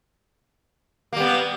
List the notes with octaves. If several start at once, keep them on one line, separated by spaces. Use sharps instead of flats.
G3 A#3 B3